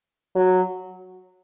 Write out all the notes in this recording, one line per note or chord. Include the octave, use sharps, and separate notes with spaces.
F#3